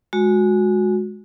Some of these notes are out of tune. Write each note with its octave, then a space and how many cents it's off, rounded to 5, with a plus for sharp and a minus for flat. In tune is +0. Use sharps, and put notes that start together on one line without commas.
G#3 +10 F#4 -20